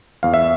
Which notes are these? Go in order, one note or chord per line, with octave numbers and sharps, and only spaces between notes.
E2 F5
E5